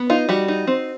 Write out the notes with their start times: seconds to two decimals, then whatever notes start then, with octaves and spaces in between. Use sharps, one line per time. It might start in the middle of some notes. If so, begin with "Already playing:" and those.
Already playing: B3
0.10 D#4 F4
0.29 G3 F#4
0.48 D#4
0.67 C4